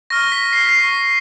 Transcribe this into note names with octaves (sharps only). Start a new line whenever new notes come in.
C#6 F6 A#6
B6
C7
B6
C7
C#6 F6